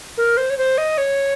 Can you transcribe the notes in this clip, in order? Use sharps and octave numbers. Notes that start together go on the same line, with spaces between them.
A#4
C5
C#5
C5
D#5
C#5